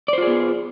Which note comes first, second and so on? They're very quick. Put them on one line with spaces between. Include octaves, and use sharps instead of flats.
D5 C5 F4 G#4 B3